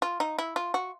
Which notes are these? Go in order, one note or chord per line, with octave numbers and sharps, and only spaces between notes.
F4
D#4
E4
F4
F#4